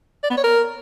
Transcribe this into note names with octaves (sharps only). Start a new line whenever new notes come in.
D5
B3
C#5
A#4